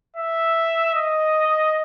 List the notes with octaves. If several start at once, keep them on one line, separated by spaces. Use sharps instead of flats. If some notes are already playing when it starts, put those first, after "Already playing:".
E5
D#5